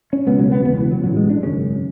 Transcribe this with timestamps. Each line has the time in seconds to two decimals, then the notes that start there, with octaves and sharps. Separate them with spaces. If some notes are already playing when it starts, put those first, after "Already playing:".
0.13 C#4
0.27 C#2 B2 B3
0.39 F#3
0.52 B3
0.65 E1 E2 C#3 B3
0.78 E3
0.91 F#3
1.04 A1 A2 F#3
1.17 G#3
1.30 D4
1.43 G#1 F#2 C#3 C#4